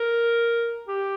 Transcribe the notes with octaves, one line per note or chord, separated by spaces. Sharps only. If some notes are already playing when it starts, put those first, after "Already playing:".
Already playing: A#4
G4